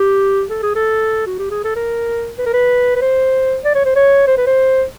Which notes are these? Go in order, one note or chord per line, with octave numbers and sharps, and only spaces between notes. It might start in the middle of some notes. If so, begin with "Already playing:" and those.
Already playing: G4
A4
G#4
A4
F#4
G4
G#4
A4
A#4
B4
A#4
B4
B4
C5
D5
C#5
C5
C#5
C5
B4
C5